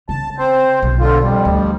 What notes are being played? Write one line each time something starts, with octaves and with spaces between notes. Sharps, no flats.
C#3 A5
C4 C5
B1
D3 F4
F2 G3
D2